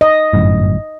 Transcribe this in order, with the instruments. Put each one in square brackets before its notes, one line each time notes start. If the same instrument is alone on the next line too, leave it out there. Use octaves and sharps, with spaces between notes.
[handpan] D#5
[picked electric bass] G1 F#2 A2